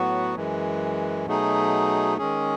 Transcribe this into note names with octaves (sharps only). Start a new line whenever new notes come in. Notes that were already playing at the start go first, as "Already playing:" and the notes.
Already playing: A2 F#3 B3 F#4
F#2 E3 G#3
B2 F#3 A3 D#4 G#4
D#3 G#3 C#4 G#4